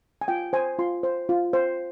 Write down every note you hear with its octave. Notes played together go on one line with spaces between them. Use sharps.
G#5
F4 G5
C5 G#5
F4 C6
C5
F4
C5